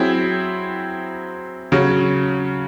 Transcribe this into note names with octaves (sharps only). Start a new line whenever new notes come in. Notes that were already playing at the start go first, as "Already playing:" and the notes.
Already playing: F#3 C4 E4 G#4
C#3 F#3 C#4